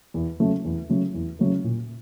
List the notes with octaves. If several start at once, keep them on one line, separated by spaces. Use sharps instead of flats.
E2
C#3 F#3 A3
E2
C#3 F#3 A3
E2
C#3 F#3 A3
A#2